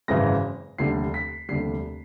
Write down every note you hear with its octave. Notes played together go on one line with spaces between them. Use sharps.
G#1 F#2 C#3 E3 G#3 A#6
F1 D#2 D3 G3 C7
B6
F1 D#2 D3 G3 C7